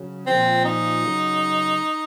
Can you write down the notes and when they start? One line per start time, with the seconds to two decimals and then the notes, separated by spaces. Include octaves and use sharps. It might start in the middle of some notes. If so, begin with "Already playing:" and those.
Already playing: C#3 F#3
0.27 A#2 F3 C4
0.65 D#4
1.02 C#3 F#3